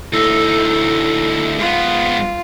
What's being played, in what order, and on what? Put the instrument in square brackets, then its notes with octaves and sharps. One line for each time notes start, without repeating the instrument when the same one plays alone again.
[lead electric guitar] D2 D#4 [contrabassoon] A2 [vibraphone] A4 E6
[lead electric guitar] G#2 B3 [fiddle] F4